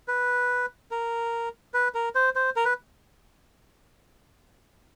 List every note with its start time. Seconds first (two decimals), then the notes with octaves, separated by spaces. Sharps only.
0.08 B4
0.91 A#4
1.74 B4
1.94 A#4
2.15 C5
2.36 C5
2.56 A#4
2.65 B4